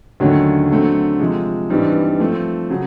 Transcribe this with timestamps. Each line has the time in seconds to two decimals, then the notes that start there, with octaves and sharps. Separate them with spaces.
0.20 D#2 D3 F#3 A3 C#4
0.70 D3 F#3 A3 C4
1.20 C3 F3 G#3
1.70 G2 E3 G3 C4 D#4
2.20 F3 A3 C4
2.70 C#3 F#3